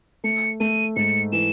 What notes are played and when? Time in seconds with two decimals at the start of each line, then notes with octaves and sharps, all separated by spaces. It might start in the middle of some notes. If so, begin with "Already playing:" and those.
0.24 A3 C#7
0.60 A3 D#7
0.96 G#2 C#7
1.32 E3 E7